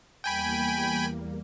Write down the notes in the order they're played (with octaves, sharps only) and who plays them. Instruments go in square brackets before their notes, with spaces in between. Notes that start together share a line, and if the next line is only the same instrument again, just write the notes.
[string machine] E2 G3 A#3 [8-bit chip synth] G5 G#5 B5